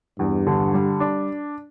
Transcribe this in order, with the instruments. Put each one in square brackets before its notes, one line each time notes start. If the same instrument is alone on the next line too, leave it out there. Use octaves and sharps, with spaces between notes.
[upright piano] E2 [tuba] G2
[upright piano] D3
G3
D4